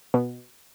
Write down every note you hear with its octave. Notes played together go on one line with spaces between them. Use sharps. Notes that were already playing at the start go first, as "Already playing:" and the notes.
B2